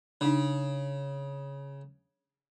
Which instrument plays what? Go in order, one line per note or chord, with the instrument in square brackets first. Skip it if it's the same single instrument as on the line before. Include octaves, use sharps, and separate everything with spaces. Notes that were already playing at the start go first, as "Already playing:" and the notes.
[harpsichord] C#3 [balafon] D4 D#4